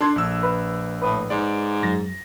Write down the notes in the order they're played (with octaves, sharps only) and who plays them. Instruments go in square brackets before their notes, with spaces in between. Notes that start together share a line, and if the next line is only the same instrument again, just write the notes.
[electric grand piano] D4 C6 G#6 [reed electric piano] A4
[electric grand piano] A#1 E6
[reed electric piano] B4
[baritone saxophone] A2 [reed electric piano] B4 D#6
[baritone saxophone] G#2 [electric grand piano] D5
[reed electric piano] F#2 [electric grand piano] A6 A#6